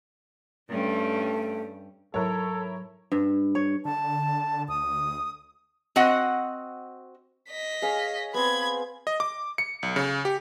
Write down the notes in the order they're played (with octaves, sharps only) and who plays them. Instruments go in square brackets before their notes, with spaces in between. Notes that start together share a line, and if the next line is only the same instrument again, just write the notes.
[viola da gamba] G2 G3 C#4 [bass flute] A3
[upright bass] G#2 F#3 [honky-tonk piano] E4 A#4 C#5 [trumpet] A4
[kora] G2
C#5
[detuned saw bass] D3 [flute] A5
[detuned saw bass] D2 [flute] D#6
[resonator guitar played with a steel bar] C4 F#4 D#5 F#5
[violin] D#5 B6
[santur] G#4 C#5 F5
[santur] B3 C4 [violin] B5 G#6
[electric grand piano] D#5
D6
C#7
B1
C#3
G4